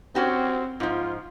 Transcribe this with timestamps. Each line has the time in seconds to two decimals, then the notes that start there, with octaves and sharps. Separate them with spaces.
0.15 C4 C#4 F#4 G4
0.80 G#2 F3 F4